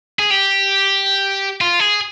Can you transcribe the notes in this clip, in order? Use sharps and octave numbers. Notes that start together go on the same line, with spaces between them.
G#4
G4
F4
G#4